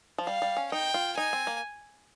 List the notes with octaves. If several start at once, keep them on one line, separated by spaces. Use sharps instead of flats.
F3
G3 F5
G3
C#4
D#4 G5
F4
D#4 G#5
C4
A#3